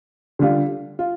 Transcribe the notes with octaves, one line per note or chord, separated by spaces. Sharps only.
D3 G3 F4
F4